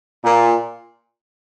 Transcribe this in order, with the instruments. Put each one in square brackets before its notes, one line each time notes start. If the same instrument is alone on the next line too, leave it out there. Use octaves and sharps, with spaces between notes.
[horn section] A#2